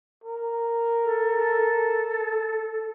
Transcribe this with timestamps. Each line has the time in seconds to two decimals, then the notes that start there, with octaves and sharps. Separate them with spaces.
0.24 A#4
1.04 A4
1.39 A4